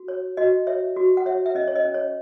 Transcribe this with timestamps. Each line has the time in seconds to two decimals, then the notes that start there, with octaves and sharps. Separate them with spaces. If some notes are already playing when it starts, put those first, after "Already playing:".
Already playing: F#4
0.08 C#5
0.37 F#4 D#5
0.67 C#5 E5
0.96 F#4
1.17 F#5
1.26 C#5 E5
1.46 E5
1.55 C#4 D#5
1.67 C#5
1.76 D#5
1.85 C#4
1.94 C#5